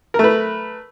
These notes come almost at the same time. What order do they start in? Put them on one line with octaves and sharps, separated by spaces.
A#4 A3 B4